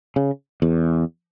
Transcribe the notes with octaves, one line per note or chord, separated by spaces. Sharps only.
C#3
E2